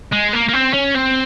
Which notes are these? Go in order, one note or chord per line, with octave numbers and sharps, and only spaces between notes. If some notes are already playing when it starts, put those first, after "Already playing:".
G#3
A#3
A#3
C4
C#4
C4